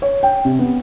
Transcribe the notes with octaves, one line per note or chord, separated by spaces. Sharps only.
C#5
G5
C3
B3